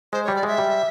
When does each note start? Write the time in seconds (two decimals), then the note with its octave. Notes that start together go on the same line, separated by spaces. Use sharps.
0.13 G#3 C5
0.24 G3 C#5
0.36 D5
0.43 G#3 E5
0.58 G3